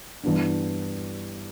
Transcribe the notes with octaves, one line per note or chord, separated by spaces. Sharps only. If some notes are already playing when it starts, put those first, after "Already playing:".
G2 E3 B3 D4